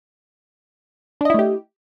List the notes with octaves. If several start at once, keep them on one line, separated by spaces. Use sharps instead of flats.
A3 D4 E4 G4 D#5